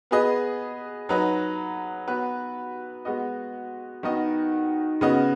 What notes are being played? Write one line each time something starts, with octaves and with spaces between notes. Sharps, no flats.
B3 G#4 B4 D#5
F#3 D#4 B4
B3 F#4 B4
G#3 B3 F#4 D#5
D#3 B3 D#4 F#4 D#5
C#3 B3 F#4 D#5